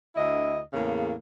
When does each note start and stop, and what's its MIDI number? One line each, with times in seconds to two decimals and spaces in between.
0.16 0.60 38
0.16 0.60 50
0.16 0.60 64
0.16 0.60 75
0.73 1.14 40
0.73 1.14 45
0.73 1.14 49
0.73 1.14 58